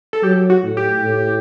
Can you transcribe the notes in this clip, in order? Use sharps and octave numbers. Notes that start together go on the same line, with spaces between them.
A4
F#3 G4
F#4
A2
G4
A2